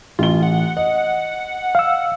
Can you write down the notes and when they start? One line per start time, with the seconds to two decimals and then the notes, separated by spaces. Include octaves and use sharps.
0.19 A1 F4 G7
0.43 F#5
0.77 D#5 F#5
1.75 F5 E6